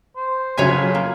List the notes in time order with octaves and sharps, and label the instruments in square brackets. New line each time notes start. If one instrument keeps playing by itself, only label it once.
[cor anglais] C5
[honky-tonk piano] F2 C#3 F#3 [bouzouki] C#5 E5 G#5
[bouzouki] A#3